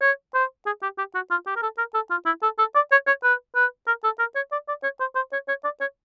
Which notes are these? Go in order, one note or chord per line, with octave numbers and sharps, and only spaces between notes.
C#5
C5
G#4
G4
G4
F#4
F4
G4
A#4
A4
A#4
A4
F4
E4
A4
A4
D5
C#5
C#5
B4
B4
A#4
A4
A#4
C#5
D5
D5
C#5
C5
C5
C#5
C#5
D5
C#5